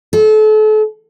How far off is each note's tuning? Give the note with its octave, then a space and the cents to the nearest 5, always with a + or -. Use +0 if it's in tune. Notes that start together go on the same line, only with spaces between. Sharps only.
A4 -35